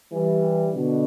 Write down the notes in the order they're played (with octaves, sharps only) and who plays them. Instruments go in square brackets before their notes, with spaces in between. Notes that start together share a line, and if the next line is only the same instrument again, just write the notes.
[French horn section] E3 G3
B2 D3